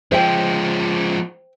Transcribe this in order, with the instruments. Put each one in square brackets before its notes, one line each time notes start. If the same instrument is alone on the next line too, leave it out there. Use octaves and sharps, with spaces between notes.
[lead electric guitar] F3 G#3 [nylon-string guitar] C5 E5 G5